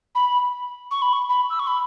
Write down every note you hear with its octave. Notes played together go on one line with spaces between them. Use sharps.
B5
C#6
B5
C#6
B5
E6
C#6
B5